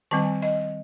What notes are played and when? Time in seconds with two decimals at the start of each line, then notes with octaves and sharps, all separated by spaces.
0.11 D#3 G3 C4 A5
0.42 D#5